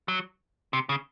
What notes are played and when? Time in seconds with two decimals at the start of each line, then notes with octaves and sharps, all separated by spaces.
0.08 F#3
0.73 C3
0.89 C#3